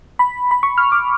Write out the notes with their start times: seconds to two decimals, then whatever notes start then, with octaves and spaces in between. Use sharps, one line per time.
0.19 B5
0.51 B5
0.63 C#6
0.78 F6
0.92 D6